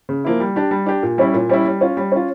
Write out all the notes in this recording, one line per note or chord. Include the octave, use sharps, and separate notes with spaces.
C#3
F3 A#3 E4
G3
D4 G4
G3
D4 G4
A#2
G3 C#4 E4
A#2
G3 C#4 E4
G3
C#4 F4
G3
C#4 F4